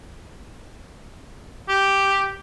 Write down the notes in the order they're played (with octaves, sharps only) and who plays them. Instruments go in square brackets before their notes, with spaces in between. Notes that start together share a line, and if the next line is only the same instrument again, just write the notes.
[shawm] G4